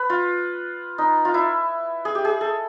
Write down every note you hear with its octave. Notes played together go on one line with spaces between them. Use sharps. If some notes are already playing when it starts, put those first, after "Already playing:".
Already playing: B4
F4
D#4
F4
E4
G#4
G4
G#4
A4